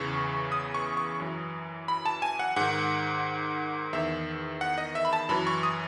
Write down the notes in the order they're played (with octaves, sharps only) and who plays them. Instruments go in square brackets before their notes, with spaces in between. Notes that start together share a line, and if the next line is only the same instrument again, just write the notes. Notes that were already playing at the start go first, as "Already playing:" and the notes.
Already playing: [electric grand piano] E2 C#3 E3 C#6
D#6
C#6
C#6
F#2 E3
B5
A5
G#5
F#5
G#2 D#3 F#5
E2 D#3 E5
F#5
D#5
E5
B5
A5
F#2 E3 B5
C#6
D#6